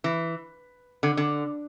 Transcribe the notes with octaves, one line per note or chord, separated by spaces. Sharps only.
E3
D3
D3